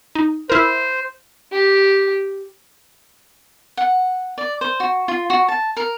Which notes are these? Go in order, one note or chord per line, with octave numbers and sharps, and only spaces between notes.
D#4
E4 A#4 C5
G4
F#5
D5
C5
F#4
F4
F#4
A5
A#4